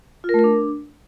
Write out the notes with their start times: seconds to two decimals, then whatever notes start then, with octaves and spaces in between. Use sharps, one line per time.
0.24 F4
0.29 A#4
0.34 A3
0.39 A#4
0.44 D4